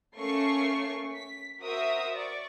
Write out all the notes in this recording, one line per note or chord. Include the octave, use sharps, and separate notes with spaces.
A3 A#3 C#4 C#6 C7
B6
F#4 A#4 C5 E5 D#6
D5 C#6